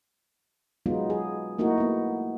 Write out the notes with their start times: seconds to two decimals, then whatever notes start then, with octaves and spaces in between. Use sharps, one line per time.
0.86 F#3 G#3 B3 D#4 F4
1.10 G#4
1.58 A3 A#3 D#4 E4 F#4
1.78 A#3 B3